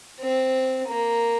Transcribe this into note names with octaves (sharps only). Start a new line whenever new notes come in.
C4
A#3